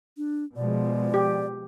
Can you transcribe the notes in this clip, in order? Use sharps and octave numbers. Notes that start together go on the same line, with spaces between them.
D4
B2 F3 G#3 D5
G4